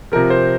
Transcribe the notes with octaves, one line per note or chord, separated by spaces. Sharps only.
C3 F3 A#4
C5